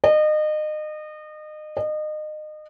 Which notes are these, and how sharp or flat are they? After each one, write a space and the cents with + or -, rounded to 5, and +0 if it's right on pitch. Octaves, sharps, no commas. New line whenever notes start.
D#5 -30
D#5 -30